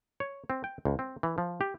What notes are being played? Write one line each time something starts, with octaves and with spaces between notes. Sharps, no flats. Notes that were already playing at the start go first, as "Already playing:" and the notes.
C#5
C4
G5
C#2
C4
E3
F3
G4